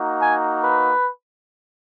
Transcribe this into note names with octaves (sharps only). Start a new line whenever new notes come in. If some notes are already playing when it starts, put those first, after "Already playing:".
Already playing: A#3 D#4 F#4
G#5
B4